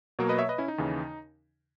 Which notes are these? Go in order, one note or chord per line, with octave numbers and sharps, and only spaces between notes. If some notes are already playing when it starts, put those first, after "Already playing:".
B2 F#3 A#3 A#4 C#5
B4 D#5
C#5 E5
B4 D#5
C#4 E4
D#4
D#2 C#3 E3